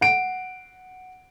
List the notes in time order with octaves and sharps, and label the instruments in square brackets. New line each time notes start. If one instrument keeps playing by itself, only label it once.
[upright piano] F#5 D7